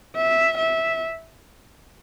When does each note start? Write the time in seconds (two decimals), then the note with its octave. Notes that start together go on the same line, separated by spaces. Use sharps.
0.16 E5
0.58 E5